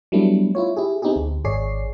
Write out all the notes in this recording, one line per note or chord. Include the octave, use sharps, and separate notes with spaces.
F#3 G3 A3 B3 D4 E4
E4 F4 C#5
E4 G4 G#4
B3 C4 D#4 E4 G4 G#4
D2
G#1 G#4 C#5 D5 C7